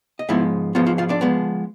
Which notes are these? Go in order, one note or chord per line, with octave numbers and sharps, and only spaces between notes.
D#5
G#2 F3 G#3 B3 E4 E5
G#2 F3 G#3 B3 F4 F5
F4 F5
F4 F5
D4 D5
F3 G#3 B3